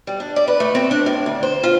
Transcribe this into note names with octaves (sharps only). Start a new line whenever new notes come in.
G3
D4
D5
B4
A3
C4
D4
A2
D2
C5
F4